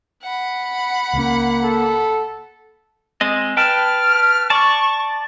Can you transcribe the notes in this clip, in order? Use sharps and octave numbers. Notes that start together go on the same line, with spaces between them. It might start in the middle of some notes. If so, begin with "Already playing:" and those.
F#5 B5
C#2 A#3 C#4
A4
G#3 C4 D#5
B4 G5 A5 F6
D5 A5 C#6